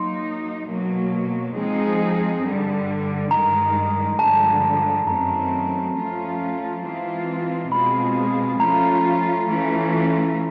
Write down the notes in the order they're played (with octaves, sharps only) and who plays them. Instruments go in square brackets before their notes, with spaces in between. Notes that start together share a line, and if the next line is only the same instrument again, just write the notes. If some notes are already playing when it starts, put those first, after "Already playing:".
Already playing: [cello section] F#3 A#3 D#4 [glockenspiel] C6
[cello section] B2 F#3 A#3
F3 G#3 C4 D#4 G#4
G2 D3 G3
[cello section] G2 D#3 G#3 [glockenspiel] A#5
[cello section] G2 D3 F3 G#3 [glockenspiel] A5
[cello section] F#2 D#3 F#3 A3 C4 [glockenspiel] A#5
[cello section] F3 A3 C#4 F4
E3 G#3 C4 F4
[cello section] B2 G#3 C4 F4 G#4 [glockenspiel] B5
[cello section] F3 A3 C#4 F4 [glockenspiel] A#5
[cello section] E3 A3 C#4 F4